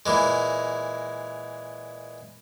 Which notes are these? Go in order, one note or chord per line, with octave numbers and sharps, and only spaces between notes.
A#2 E3 G#3